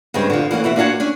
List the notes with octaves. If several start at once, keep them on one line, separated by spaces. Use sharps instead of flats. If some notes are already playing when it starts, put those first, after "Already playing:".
G2 C#3 G#3 C4
D3 F3
E3 A#3 C#4 F#5
B2 E3 E5 F#5
A#3 D4 F4 F#4 F#5 G#5
C#4 D4